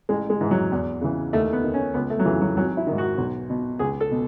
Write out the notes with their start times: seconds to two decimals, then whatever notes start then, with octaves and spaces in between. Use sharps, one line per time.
0.09 A1 G#3
0.30 G#3
0.41 G#2 E3
0.51 F#3
0.72 E2
1.01 C#3 E3
1.33 D#2 A3
1.53 B3
1.64 D#3
1.74 C#4
1.94 C#2 B3
2.10 A3
2.19 F#3
2.25 C#3 E3
2.41 F#3
2.57 G#1 F#3
2.77 E4
2.87 G#2 D#3
2.98 F#4
3.18 B1
3.50 B2
3.79 C#2 G#4
4.00 A4
4.11 B2